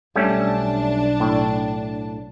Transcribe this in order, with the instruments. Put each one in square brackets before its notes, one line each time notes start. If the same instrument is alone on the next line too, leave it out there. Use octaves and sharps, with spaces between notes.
[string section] B1 D4 A5 [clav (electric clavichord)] G3 A3 C#4
[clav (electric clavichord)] A2